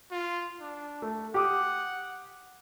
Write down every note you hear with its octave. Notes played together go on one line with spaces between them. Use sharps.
F4
D4
A3
G4 F#5 D6 D#6